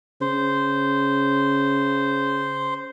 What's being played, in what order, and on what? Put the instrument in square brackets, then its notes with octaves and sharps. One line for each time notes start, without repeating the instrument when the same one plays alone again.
[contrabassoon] C#3 [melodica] C5